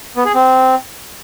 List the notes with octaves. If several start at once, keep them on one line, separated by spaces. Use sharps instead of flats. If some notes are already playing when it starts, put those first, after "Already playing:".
B3
G#4
C4